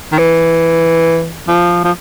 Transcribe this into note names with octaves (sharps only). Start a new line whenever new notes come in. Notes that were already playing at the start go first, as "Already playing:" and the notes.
D#3
E3
F3
F3